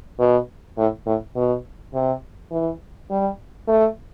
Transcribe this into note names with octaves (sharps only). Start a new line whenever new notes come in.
B2
A2
A2
B2
C3
E3
G3
A3